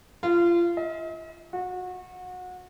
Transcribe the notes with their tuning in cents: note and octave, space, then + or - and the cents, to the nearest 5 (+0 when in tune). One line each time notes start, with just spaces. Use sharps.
F4 -25
D#5 +45
F#4 -25